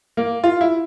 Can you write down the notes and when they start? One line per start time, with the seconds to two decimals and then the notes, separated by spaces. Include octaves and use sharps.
0.17 A#3
0.44 F4
0.61 E4